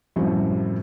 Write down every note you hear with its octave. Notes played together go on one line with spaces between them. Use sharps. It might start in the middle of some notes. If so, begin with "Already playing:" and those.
F#2 A2 C3 F3 G3 F#4